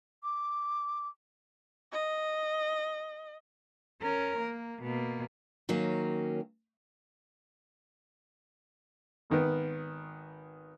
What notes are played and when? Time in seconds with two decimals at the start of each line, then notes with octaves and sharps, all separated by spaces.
0.23 D6
1.92 D#5
4.02 C#4 A#4
4.39 A#3
4.83 B2 A#3
5.69 D#3 F#3 A#3 C#4
9.30 G#1 D#3 B3